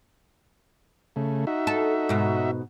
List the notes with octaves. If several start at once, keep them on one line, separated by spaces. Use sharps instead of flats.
C#3 A3
D#4 F#4 E5
A4
G#2 B2